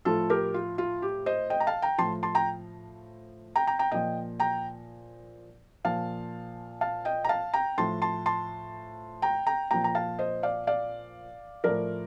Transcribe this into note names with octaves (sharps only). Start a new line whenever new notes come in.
A2 F3 F4 A4
G4 A#4
F4
F4
G4
C5 D#5
D#5 G5
A#5
F5 A5
G5 A#5
A2 F3 A5 C6
A5 C6
G5 A#5
G5 A#5
G5 A#5
G5 A#5
A#2 F3 D#5 G5
G5 A#5
A#2 F3 F5 A5
F5 A5
D#5 G5
A#5
F5 A5
G5 A#5
A2 F3 A5 C6
A5 C6
A5 C6
G5 A#5
G5 A#5
A#2 F3 G5 A#5
A#5
F5 A5
C5 D#5
D5 F5
D5 F5
A2 F3 A#4 D5